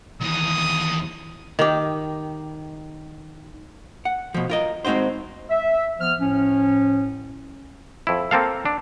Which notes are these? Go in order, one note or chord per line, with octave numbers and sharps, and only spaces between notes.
D#2 E3 D#6
D#3 G4
F#5
B2 F3
F4 A#4 D#5
G#3 C4 D#4 F#4 C5
E5
F3 B3 F6
A2 F3 C#4
F2 E4
A#3 C4 A4 F5
D4